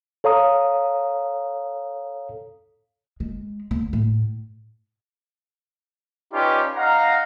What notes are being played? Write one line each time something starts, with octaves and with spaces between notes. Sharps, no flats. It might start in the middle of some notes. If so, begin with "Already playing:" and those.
A4 C#5 F5 A#5 D#6
G#3
D2
A2
C#4 D#4 F4 G4 B4 D5
D#4 F5 F#5 A#5